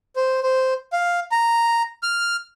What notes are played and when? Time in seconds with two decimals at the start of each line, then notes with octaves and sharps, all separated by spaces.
0.16 C5
0.43 C5
0.93 F5
1.32 A#5
2.03 F6